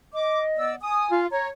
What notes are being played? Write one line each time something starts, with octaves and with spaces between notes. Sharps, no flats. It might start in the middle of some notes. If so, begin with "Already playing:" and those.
D#5 D6
B3 D5 E6
G#5 D#6
F4
C#5 A#5